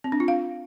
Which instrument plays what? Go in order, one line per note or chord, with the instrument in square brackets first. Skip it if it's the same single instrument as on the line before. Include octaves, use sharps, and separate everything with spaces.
[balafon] C4
D4
F4
F5